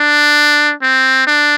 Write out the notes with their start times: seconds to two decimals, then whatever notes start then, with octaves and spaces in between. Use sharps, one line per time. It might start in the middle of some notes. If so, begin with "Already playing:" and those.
Already playing: D4
0.82 C4
1.27 D4